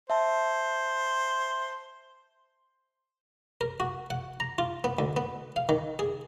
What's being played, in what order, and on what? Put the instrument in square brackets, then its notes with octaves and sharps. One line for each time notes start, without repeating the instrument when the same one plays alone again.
[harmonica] C5 [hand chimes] E5 A5
[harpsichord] A#4
F#4
F#5
A#5
F4
B3
D2
B3
F5
D#3
G#4